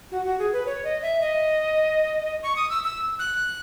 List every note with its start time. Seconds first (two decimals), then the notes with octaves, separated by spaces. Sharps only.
0.12 F#4
0.25 F#4
0.39 G#4
0.53 B4
0.66 C#5
0.84 D#5
1.02 E5
1.21 D#5
2.43 C#6
2.56 D#6
2.69 E6
2.84 E6
3.19 F#6